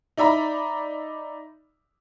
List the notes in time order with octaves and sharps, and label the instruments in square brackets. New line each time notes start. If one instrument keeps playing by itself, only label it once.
[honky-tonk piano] D#4 D5 E5 A#5 B5